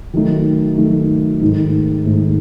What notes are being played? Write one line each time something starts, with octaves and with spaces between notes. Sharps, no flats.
D#3 F#3 A3 D#4
D#3 F#3 A3 D#4
G#2 D#3 A3 D#4
G#2 D#3 A3 D#4